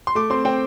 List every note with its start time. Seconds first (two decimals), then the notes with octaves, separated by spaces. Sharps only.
0.07 C6
0.15 A3 D6
0.30 C4 C6
0.45 C4 G5